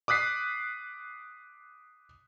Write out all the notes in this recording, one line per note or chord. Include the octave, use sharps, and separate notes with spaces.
D6 D#6 F#6 B6 C7